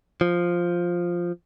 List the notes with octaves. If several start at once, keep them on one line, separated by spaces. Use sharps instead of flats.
F3